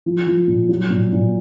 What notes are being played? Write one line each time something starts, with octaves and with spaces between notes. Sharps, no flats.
F3
F3
A#2
F#3
A#2
A#2